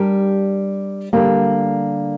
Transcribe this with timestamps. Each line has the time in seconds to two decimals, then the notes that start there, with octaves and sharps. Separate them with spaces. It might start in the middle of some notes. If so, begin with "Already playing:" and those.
Already playing: G3 D4 G4 A#4
1.13 D3 G3 A#3